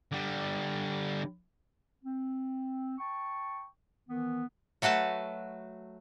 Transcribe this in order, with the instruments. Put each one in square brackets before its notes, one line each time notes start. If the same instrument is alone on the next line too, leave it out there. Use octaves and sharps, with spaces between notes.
[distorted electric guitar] D3 G3
[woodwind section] C4
G5 A5 C#6
D#3 E3 B3
[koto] F#3 A3 F#4 B4 A5